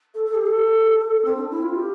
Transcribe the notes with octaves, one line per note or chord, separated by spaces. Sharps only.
A4
A4
G4
A4
C4
D4
E4
F4
G4